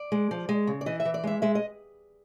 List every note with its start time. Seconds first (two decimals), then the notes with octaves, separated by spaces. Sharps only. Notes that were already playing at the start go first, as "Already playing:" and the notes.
Already playing: D5
0.12 G#3
0.31 F3
0.49 G#3
0.67 C#3
0.81 D5
0.86 E3 D#5
1.00 E5
1.05 E3
1.14 D5
1.24 G#3 E5
1.42 G#3 E5
1.55 D#5